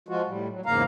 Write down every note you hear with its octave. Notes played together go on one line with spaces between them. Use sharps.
F3 G#3 F4 F#4
A2 G3
F#3
E2 G#2 C#3 A#3 F5 A#5